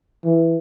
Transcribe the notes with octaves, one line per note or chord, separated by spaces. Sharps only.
E3